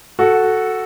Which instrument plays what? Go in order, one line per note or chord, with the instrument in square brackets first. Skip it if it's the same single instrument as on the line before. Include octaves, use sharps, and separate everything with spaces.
[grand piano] F#4 A4